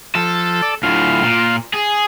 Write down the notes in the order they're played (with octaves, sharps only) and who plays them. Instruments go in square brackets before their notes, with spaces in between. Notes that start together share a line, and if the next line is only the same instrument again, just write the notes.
[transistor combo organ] F3 [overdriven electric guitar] A4
[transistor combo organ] D5
[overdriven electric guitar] D2 A2 [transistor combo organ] F4 F5
[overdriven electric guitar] A#2
G#4